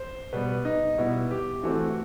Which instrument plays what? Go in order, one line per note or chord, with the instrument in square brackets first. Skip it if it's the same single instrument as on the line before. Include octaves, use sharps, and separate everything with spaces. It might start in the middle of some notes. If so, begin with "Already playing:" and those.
Already playing: [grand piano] C5
B2 G3 B3 B4
D#4
B2 G3 B3 E4
G4
E3 A3 C4 F#4